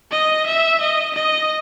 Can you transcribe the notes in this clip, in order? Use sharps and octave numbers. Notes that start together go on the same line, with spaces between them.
D#5
E5
D#5
D#5